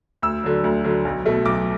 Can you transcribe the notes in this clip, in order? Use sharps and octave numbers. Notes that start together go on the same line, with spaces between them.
D2 E6
D3 F#3
D2
D3 F#3
B1
B2 A3
B1 D6